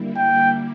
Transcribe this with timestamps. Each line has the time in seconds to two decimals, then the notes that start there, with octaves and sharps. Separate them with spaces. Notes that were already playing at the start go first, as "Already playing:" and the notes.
Already playing: D3 G3 A#3 E4
0.17 G5